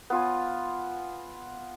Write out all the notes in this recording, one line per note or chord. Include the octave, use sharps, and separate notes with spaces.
B3 F4 G#5